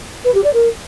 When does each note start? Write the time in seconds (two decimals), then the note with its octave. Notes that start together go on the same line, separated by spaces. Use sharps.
0.24 B4
0.34 G4
0.43 D5
0.53 A#4